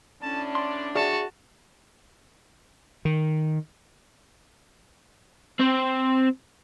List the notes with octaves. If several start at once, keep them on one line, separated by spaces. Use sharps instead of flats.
A2 C#4 D4 A5
D5 C6
F#4 G#4 D5 E5 A5 C#6
D#3
C4 C5